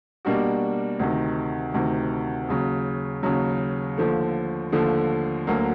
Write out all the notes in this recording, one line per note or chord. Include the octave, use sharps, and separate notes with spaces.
B2 G3 A#3 D4 F#4
D2 C3 D#3
D2 C3 D#3
D#2 C#3 F#3
D#2 C#3 F#3
D#2 D3 F3 A3
D#2 D3 F3 A3
D2 D3 F#3 A#3